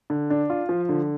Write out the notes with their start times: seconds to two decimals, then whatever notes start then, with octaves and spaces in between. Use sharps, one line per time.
0.10 D3
0.30 D4
0.50 F4
0.69 F3
0.89 D3